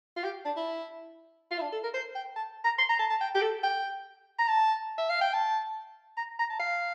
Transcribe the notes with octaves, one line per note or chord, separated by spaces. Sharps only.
F4
G4
D4
E4
F4
E4
D4
A4
A#4
C5
G5
A5
A#5
C6
A#5
A5
A5
G5
G4
A4
G5
A#5
A5
E5
F5
G5
A5
A#5
A#5
A5
F5